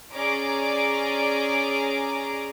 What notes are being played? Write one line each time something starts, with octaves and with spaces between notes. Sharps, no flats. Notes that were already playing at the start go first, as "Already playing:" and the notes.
C#4 G#4 D5 A#5 D6 D7